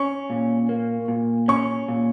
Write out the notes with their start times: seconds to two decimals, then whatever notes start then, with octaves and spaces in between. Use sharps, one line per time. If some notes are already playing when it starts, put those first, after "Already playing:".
Already playing: C#4 C#6
0.30 A#2
0.69 A#3
1.08 A#2
1.48 C#4 C#6
1.88 A#2